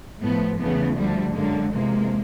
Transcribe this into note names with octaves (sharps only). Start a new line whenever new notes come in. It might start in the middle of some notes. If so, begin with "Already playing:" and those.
A2 F3 A3 B3
E2 C#3 E3 A3 B3
D2 D3 F3 G3 A3
F#2 D3 F#3 G#3 A#3
E2 C3 F3 G#3 A#3